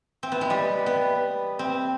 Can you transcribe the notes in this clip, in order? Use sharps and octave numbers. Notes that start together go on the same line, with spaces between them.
C4
B3
G#3
G3
B3
C4